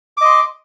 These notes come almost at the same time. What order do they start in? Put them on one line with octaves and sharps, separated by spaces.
D6 D#5 C6